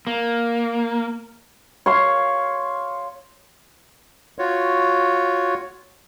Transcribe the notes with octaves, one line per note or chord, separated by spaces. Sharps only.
A#3
C#5 F5 C6
F4 F#4 C#5